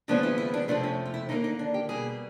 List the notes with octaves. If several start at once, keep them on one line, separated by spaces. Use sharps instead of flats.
D#2 C#3 F3 G#3 B3 D4
E4
E4
D4
F2 C3 F3 A3 D4
C#4
F4
E4
D#2 D3 G3 A#3 D#4
D#4
D4
G4
B2 G3 A#3 G#4